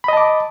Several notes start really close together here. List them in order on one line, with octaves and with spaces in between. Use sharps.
B5 D#5 A5 D6